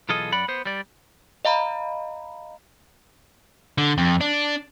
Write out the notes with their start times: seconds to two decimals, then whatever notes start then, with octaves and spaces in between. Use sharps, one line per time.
0.09 B1 E3 F4 G#4 A4 D#5
0.32 F#2 D5 F#5 B5
0.48 B3 C5
0.66 G3 D5
1.45 D#5 F5 A#5 B5
3.78 D3
3.98 F2
4.21 D4